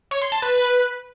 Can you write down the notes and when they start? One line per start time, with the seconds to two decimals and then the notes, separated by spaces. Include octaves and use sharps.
0.11 C#5
0.22 C6
0.32 A5
0.42 B4